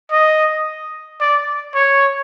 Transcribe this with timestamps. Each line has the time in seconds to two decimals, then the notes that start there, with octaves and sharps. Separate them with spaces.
0.11 D#5
1.20 D5
1.75 C#5